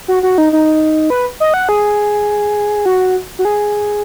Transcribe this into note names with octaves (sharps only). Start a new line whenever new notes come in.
F#4
F#4
D#4
D#4
B4
D#5
F#5
G#4
F#4
F#4
G#4